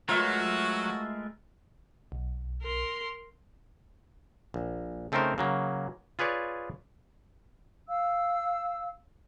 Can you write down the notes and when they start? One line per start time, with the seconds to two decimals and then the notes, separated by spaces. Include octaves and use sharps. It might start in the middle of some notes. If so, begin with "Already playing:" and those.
0.09 F#3 G#3 A3 F4 F#4 A#4 B4 E5
2.12 B1
2.62 A#4 C6
4.54 A#1
5.12 C#3 A3 C4 D#4 A#4 C5
5.38 C#3 F#3 A#3
6.19 F4 G#4 B4 C#5 D5
7.88 F5 E6